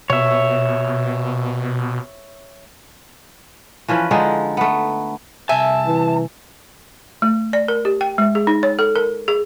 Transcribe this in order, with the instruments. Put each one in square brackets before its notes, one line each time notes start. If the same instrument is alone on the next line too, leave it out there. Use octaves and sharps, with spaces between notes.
[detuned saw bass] B2 [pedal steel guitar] C#5 E5
[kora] E3 F3 C#4 B4
D3 F3 G#3 D#4
A3 B3
[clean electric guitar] C2 G#5 [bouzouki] E5 [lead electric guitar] A5
[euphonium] E3
[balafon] A3
D5
A#4
G4
G5
G#3
G#4
D#4
C#5
A4
A#4
G#4